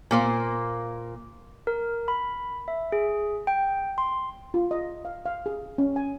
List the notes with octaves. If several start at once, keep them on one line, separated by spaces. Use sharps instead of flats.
A#2 A#3 C5
A#4
B5
E5
G#4
G5
C6
F4
D#5
F5
F5
G#4
C#4
G#5